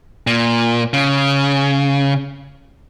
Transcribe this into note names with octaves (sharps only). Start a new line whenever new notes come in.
A#2
C#3